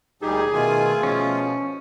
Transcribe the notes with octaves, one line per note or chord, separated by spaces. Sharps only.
D2 A#2 G3 D#4 G4 G#4
B2 D#3 A3 F4 G#5
B2 F3 C#4